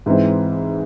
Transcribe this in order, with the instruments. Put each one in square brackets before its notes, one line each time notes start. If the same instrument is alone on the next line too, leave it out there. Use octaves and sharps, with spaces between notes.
[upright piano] G#2 E3 G#3 C4